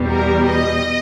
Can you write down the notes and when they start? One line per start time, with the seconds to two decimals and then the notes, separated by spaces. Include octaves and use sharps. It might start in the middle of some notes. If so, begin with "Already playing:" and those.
Already playing: E2 B2 G3
0.08 A#4
0.45 D#5